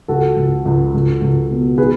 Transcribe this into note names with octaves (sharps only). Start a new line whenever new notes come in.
C#2 F#4 A4
C#2
C#2
C#2
C#2
B2
D#3 G#4 B4